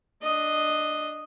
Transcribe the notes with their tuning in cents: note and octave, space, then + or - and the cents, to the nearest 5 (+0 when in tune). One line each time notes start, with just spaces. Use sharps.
D4 +15 D#5 +0